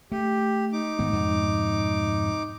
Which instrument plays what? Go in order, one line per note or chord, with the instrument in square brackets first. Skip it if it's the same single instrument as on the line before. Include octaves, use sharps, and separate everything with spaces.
[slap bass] A3 [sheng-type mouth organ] G4
[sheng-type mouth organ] D#4 D6
[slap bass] G#2 D#3 B3
F2 G#2 B2